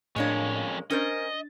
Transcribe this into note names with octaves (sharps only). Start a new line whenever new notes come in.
F2 A2 G#3 A#3 C#4 D4 C#5
C#4 D4 A#4 C5 D#5 A6